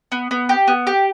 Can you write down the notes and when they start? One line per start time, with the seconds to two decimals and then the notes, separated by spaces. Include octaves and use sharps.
0.12 B3
0.31 B3
0.49 G4
0.68 B3
0.87 G4